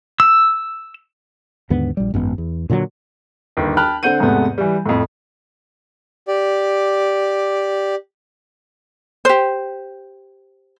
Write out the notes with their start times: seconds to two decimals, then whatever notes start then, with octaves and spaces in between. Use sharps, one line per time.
0.20 E6
1.70 D#2 G#2 D3 B3
1.97 A#1 G3
2.14 G#1 F#2 G#3 B3
2.38 E2
2.70 A#2 D3 F3 F#3
3.57 G1 D#2
3.77 G5 A5 B5 F6 F#6
4.03 D3 C4 F#5 G6 D#7
4.20 E2 G#2 C3 A3 B3
4.58 E3 G3
4.86 F2 A2
6.28 G4 D5
9.25 G4 C5